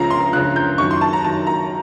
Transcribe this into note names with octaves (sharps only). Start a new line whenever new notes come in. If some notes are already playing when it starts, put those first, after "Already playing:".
Already playing: C#2 C#3 F3 A#5
C6
C#2 C#3 F3 F#6
G6
F#2 D#3 C#6
C6
A5
A#5
F#2 D#3 A5
A#5